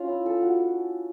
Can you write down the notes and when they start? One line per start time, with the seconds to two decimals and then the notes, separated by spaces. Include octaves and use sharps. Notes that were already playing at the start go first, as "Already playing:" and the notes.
Already playing: C#4 F4
0.09 E4
0.26 A4
0.42 F#4